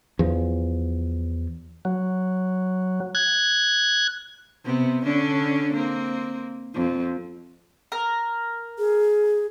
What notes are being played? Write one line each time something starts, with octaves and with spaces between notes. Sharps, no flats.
E2 F3
F#3
F#6 G#6
C3 B3
D3 C#4 D4
A#3 C4
F2
A#4
G#4